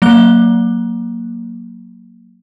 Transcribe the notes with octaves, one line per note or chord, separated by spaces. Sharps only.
F#3 A#3 F#6 G7